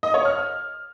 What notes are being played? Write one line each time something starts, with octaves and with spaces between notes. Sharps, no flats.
D#5
C#5
F6